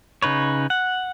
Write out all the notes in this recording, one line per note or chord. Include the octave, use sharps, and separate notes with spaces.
C#3 D#4 B4 C#5
F#5